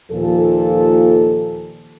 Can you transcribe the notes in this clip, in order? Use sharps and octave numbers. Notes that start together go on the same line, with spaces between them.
D#2 A#2 F3 A4